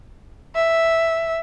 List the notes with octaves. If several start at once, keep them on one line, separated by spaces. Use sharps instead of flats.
E5